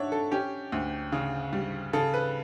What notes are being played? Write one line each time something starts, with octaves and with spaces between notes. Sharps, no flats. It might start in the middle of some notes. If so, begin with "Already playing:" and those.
Already playing: D4 C#5 E5 F#5
A4
C#4 G4
D2
C#3
G3
C#3 A4
B4